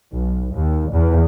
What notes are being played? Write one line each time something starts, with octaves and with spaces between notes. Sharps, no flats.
B1
D#2
E2